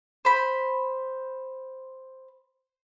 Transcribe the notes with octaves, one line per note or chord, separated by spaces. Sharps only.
C5 B5